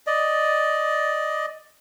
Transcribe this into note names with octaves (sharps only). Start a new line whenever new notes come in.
D5 D#5